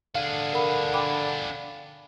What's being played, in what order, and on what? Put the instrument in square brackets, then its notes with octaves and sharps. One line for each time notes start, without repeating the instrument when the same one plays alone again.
[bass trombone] D3 [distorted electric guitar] D4 G#4 [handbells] F5
[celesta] A#4 F#5 B5
G5 B5 D6